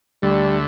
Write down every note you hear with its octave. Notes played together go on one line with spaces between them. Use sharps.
D2 D3 G3 A3